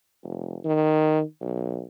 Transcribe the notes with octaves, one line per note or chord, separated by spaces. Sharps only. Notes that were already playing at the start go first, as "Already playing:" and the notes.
F1
D#3
B1